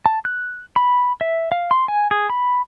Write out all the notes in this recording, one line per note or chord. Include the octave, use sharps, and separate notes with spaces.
A5
F#6
B5
E5
F5
C6
G#5
G#4
B5